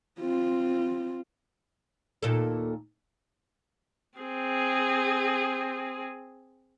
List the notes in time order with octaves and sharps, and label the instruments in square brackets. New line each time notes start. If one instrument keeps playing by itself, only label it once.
[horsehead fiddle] C4 F4
[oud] D#2 A#2 A4
[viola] C4 G#4